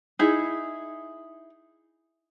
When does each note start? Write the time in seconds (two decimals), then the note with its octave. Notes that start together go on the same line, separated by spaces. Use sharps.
0.19 D#4 E4 G#4